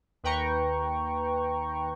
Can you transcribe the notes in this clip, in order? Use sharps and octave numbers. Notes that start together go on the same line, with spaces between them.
D#2 B4 G5 A#5 C#6